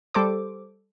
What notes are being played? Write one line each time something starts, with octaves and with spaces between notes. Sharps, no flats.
G3 A4 C5 D6